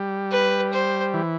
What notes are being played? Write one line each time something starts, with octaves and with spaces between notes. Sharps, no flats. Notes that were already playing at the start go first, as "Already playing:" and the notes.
Already playing: G3
B4
C5
E3